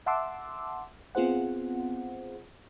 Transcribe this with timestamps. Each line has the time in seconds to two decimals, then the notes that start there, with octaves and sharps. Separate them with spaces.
0.06 E5 F#5 A5 C6 D6 E6
1.15 B3 C4 F4 G#4 C5 F#5